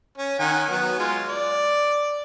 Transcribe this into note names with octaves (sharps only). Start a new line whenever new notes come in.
C#4
D#3 F#5 G#5
F#3 B3
G#3 F4
D5